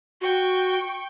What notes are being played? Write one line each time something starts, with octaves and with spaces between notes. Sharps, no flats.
F#4 G5 C#6